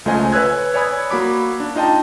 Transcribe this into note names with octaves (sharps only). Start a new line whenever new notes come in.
C#2 A3 F4 C5 D#5 G#5
B4 C#5 G#5 E6 F#6 G#6
C#5 D5 G#5 B5 D#6 G#6
A#3 F#4 B5 D6
D4
D#4 F4 D#5 G5 A5